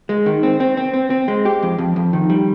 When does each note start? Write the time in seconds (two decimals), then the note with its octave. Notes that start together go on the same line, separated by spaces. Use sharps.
0.09 G#3
0.26 D#3
0.43 C4
0.60 C4
0.77 C4
0.94 C4
1.10 C4
1.28 G#3
1.45 G4
1.63 F2
1.78 F2
1.96 F2
2.13 D#3
2.30 G3